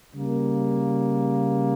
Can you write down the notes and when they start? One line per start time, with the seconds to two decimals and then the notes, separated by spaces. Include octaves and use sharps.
0.14 C#3 G3 A#3